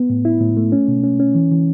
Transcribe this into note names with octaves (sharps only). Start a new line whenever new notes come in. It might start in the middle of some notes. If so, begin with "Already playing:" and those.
Already playing: B3
A2
E4
A2
A3
C#4
B2
C#4
C#4
E3
E3